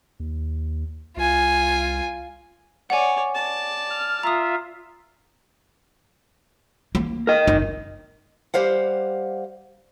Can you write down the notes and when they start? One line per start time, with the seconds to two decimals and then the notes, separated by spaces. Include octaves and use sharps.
0.20 D#2
1.17 C2 F4 G#5
2.90 C#5 D5 F#5 G#5
3.35 D5 A5
3.90 F6
4.23 F4 E5 A#5 D#6
6.95 A#3
7.27 A#4 D#5
7.48 F#1 D#4
8.54 G3 G4 C5 F5 F#5